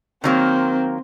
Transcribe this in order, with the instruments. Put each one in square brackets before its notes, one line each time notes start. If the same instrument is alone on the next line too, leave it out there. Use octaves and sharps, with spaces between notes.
[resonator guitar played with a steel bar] D#3 F#3 A#3 [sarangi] C4